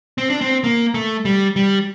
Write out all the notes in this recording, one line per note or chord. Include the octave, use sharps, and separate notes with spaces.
C4
D4
C4
A#3
A3
G3
G3